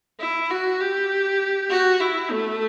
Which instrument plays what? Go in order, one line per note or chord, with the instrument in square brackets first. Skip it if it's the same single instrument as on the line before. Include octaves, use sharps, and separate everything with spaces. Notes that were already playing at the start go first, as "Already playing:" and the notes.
[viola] E4
F#4
G4
F#4
E4
A3